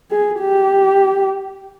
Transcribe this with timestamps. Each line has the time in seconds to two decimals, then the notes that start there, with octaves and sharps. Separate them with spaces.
0.11 G#4
0.41 G4